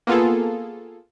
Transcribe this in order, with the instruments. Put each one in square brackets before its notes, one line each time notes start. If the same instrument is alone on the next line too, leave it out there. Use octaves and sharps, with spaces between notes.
[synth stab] A#3 B3 F4 G#4 A4